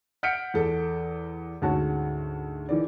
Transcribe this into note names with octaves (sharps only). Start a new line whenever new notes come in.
F#5 F6 G6 B6 C#7 D7
E2 A4
D2 G#2 C#4 F#4 A5
D#3 E3 D5